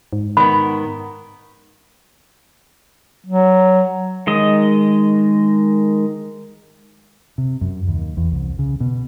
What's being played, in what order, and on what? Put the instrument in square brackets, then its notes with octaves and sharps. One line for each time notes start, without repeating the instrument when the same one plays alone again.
[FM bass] G#2
[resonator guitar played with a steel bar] D#3 B3 [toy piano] B5
[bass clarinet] F#3
[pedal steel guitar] D#3 G#3 D#5
[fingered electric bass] C3
F#2
D#2
E2
C2
C#3
B2